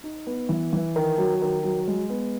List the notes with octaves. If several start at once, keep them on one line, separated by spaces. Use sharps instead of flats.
D#4
B3
E3
E3
D#3
F#3
D#3
F#3
G#3
B3